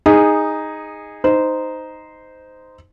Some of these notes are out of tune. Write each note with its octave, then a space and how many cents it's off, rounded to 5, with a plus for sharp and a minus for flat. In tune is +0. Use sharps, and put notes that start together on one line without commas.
D#4 +0 G#4 -15
D#4 +0 C5 -15